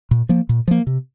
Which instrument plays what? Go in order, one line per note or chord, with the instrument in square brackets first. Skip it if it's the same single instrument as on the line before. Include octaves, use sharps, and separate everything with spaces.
[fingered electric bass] A#2
F3 A#3
A#2
F3 A#3
C3